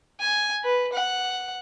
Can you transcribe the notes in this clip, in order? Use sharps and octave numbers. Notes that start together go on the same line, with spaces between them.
G#5
B4
F#5